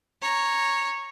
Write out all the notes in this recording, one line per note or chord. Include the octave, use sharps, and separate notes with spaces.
C#5 A#5